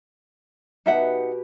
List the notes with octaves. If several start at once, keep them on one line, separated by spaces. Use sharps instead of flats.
B2 D#4 G4 E5 F#5